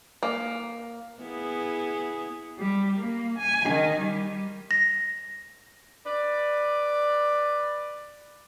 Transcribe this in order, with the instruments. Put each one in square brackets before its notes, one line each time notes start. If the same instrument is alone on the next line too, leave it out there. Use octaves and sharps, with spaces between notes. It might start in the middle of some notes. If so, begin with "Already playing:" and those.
[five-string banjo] A#3
[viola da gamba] B3 E4 G#4
[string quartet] G3
A#3
G#5
D#3
G3
[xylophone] A#6
[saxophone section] B4 D5